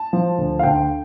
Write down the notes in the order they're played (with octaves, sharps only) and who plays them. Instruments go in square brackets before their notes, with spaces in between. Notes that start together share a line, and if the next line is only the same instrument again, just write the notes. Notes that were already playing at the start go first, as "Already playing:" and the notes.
Already playing: [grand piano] A5
F3
D2
F5
D2 G5